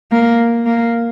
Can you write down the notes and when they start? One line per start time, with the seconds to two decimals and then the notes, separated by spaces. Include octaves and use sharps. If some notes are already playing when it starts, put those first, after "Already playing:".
0.11 A#3
0.65 A#3